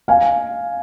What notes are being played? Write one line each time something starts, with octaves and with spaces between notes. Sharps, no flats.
F5 G#5